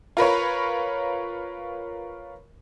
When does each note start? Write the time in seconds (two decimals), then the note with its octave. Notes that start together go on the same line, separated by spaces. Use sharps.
0.17 F4 A#4 B4 C#5